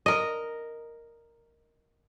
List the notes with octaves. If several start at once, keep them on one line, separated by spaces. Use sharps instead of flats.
A#4 D#5